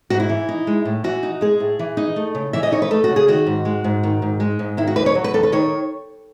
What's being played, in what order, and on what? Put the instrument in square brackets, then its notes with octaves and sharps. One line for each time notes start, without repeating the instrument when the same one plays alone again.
[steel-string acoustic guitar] G#2 F#4
E4
E3
D#4
G#3
A2
E3 F#4
D#4
G#3 G#4
A2
E3
D#4
A3
C#3
E3 E5
D#5
D#4 C#5
B4
A3 A4
F#4
C#3
G#4
D#3 F#4
G#2
G#3
G#2
D#3
G#2
G#3
G#2
D#3 E4
F#4
D#2 B4
C#5
F#3
B4
D#2 A4
B4
D#3 C#5